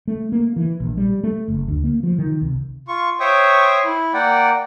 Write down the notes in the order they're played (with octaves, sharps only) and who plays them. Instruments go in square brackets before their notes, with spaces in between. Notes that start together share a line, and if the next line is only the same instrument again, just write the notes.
[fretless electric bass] A3
A#3
E3
A#1
G3
A3
F#1
D2
A#3
F3
D#3
C2
[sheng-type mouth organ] F4 C#6
C5 C#5 E5 G5 C#6 D#6
E4
A#3 D5 F#5 G5